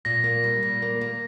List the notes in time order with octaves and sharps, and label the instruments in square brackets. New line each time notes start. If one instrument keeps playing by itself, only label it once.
[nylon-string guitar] A#2 [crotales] A#6
[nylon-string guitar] A#3
G3
A#2
A#3
A#3